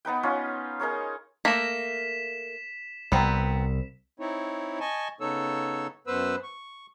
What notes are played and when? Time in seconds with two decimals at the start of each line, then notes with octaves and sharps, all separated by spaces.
0.05 B3 D#4 B4 G5
0.23 C#4 D#4 F4
0.80 D#4 G#4 A#4 C#5
1.45 A3 A#3 F5 A#6 B6 E7
3.12 C2 B3 C4 F#5 G5 A#5
4.20 C4 D#4 E4 C#5
4.80 D#5 G#5 A5 C#6
5.21 C#3 B3 D#4 A4 C#5 E6
6.07 F#2 B3 B4 C5 E6
6.43 C#6